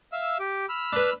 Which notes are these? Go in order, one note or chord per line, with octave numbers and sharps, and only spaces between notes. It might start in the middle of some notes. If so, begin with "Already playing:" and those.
E5 F5 E6
G4 D6
B5 E6 F6
D4 B4